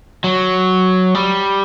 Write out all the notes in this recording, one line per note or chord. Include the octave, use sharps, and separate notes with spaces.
F#3
G3